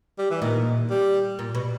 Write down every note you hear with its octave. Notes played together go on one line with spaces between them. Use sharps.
G3
E3
A#2 D#3
G3
A#2
B2